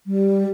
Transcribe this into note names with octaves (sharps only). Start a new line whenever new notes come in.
G3